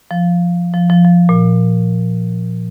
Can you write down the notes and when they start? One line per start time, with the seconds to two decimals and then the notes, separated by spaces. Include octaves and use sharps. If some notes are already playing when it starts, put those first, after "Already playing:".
0.11 F3
0.74 F3
0.90 F3
1.05 F3
1.29 A#2